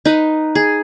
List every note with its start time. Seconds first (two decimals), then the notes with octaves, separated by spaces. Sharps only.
0.05 D#4 B4
0.55 G#4